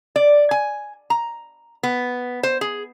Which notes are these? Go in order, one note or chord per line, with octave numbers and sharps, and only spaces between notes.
D5
G#5
A#5
B3
C5
G#4